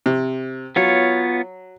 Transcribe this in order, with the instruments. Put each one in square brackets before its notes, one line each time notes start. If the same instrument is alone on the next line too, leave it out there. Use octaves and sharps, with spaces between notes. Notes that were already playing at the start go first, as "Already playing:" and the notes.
[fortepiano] C3
[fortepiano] F#3 [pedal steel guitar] B3 F4 C#5